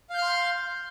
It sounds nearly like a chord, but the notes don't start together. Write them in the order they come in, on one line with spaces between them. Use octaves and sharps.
F5 G6 F6 C6